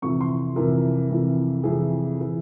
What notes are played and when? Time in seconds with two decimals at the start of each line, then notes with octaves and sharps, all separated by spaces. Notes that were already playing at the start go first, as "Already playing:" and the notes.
0.02 F2 C3 E3 C#6
0.21 C6
0.56 F2 C3 E3 A#4
1.10 F2 C3 E3
1.63 F2 C3 E3 G#4
2.21 E3